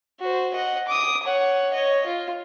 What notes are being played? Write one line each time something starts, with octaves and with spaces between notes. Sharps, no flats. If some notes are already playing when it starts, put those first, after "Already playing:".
F#4 C5
D#5 F#5
D6 D#6
C#5 F#5
C#5 D#5
F4